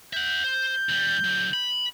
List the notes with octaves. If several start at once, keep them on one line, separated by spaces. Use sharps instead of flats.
E5 F#5 G6
C5
D#2 G3
D3 F#3
B5